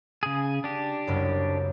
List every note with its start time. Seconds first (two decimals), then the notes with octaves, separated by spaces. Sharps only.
0.23 C#3 G#4
0.64 D4 G4
1.07 F#1 C2 F#2